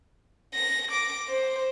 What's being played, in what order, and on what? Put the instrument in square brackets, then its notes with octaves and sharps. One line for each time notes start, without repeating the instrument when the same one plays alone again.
[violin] A#6
D6
C5